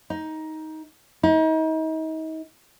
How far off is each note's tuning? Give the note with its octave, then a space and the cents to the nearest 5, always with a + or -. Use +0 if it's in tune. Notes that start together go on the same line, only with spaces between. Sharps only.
D#4 +15
D#4 +35